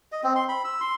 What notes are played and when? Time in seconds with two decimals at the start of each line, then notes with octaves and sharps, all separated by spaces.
0.12 D#5
0.23 C4
0.36 C6
0.49 B5
0.65 E6
0.81 C6